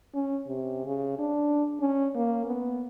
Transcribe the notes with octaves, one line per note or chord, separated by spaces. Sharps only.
C#4
C3
C#3
D4
C#4
A#3
B3